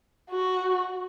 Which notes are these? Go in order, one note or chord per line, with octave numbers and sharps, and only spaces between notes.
F#4